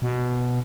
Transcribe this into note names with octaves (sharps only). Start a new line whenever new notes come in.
B2